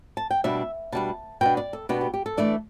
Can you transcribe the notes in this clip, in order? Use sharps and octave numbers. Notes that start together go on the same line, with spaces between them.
A5
G5
B2 G3 D4 E5
B2 G3 D4 A5
B2 B3 D4 G5
D5
A4
B2 B3 D4 G4
G4
G4
A4
E3 A3 D4 D5